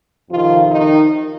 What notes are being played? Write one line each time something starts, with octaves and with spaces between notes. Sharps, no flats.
F2 C3 D#3 F3 F4
D#3 D#4